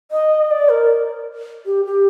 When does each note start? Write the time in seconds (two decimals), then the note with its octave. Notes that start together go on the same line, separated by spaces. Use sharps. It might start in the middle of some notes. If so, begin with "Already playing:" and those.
0.11 D#5
0.51 D5
0.69 A#4
1.66 G4
1.85 G4